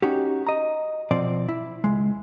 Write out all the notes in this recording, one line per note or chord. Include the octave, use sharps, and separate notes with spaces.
C#4 D#4 F#4 G4
D#5 A#5
B2 F3 C4 D5
E4
C#2 G#3